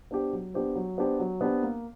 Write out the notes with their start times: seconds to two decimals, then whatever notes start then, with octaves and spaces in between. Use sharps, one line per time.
0.11 B3 D4 G4 C5
0.33 F#3
0.54 B3 D4 G4 C5
0.76 F#3
0.98 B3 D4 G4 C5
1.19 F#3
1.41 B3 D4 G4 C5
1.63 A#3